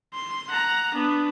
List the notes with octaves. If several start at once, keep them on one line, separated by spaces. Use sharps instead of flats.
C6
F#5 A#5
B3 D4